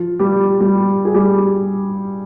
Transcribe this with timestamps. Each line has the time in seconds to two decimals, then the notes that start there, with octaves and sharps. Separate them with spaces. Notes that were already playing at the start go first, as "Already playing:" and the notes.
Already playing: F3 F4
0.20 G3 G4
0.60 G3 G4
1.05 G#4
1.15 G3 G4